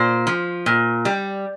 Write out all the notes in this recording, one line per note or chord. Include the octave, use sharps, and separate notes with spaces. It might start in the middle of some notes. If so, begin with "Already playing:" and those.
Already playing: A#2 C5
F3
A#2
G3